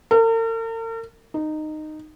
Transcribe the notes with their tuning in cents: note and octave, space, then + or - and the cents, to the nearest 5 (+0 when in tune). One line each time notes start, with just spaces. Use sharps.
A#4 -45
D#4 -15